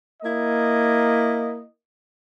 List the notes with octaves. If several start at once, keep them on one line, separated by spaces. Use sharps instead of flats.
A#3 E4 D#5